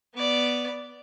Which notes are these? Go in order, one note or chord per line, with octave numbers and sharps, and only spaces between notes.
B3 D5